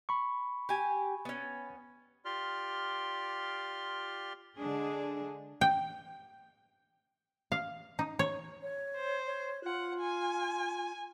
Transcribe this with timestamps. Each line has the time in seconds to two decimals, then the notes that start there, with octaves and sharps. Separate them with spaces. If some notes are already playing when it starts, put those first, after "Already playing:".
0.09 B5 C#6
0.69 G4 G#5
1.25 B3 C#4
2.25 F4 G4 D5 C6 F6
4.58 D3 G#3 D4 G#4
5.61 G5
7.52 F5
7.99 D#4
8.19 C#5
8.62 C#5
8.96 C5
9.26 C#5
9.64 F4 F#5
10.00 G#5